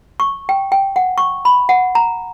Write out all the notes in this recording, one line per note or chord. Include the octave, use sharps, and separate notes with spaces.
C#6
G5
G5
F#5
C#6
B5
F#5
A#5